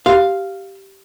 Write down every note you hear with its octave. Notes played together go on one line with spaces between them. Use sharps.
G4 F5 C6